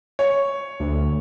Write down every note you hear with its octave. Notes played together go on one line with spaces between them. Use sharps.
C#5
D2